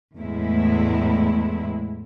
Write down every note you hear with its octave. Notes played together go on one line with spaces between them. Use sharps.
E2 A2 G#3 E4